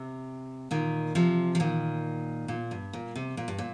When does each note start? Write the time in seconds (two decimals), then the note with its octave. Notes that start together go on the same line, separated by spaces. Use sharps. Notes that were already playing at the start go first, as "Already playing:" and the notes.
Already playing: C3
0.71 A#2 D#3
1.15 C3 F3
1.55 F3
1.60 A#2 D#3
2.48 A#2
2.71 G2
2.93 A#2
3.15 C3
3.37 A#2
3.48 G2
3.58 A#2